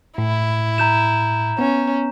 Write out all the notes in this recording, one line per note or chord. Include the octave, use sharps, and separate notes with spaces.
A2 E4
A#5 G6 E7
B3 C#4